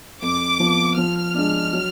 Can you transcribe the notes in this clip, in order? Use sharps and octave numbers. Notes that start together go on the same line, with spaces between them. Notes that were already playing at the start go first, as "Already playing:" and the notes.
F2 D6
F3 B3
F3 F6
G#3 D4
F#3